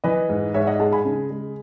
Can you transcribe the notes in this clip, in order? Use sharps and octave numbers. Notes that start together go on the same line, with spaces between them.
E3 B4 D#5
G#2
G#2 C#5 E5
D#5 F#5
G#3 F#5 A5
G#5 B5
C#3
G#3